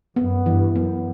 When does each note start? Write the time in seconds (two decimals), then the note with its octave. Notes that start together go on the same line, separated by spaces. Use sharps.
0.16 F#2 B3
0.46 G2 E3
0.76 F#2 B3